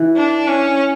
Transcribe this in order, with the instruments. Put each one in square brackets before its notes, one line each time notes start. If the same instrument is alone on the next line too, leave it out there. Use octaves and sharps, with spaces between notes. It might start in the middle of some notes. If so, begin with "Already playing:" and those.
Already playing: [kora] E3
[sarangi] D4
C#4